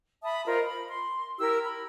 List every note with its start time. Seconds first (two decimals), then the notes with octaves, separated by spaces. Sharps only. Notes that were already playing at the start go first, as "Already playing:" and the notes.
0.23 E5 A5 B5 D#6
0.46 F4 A#4 C5 D#5
0.65 B5
0.89 C6
1.39 E4 G4 A#4 E6
1.65 B5